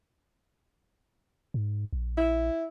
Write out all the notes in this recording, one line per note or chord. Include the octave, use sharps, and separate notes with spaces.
G#2
A#1
E4